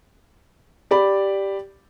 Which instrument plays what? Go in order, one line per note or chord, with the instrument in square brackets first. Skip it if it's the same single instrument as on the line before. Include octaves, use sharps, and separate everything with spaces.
[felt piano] G4 D5 B5